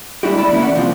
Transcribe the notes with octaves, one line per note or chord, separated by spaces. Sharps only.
G3 G#3 D4 E4 F#4 G4
D2 E4 D5 B5
E3 A#3 C#4 E4
C#4 D5 F#5
C2 A#2 F3 C4